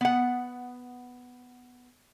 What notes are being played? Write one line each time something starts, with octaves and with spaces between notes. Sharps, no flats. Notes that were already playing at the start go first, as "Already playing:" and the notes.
B3 F#5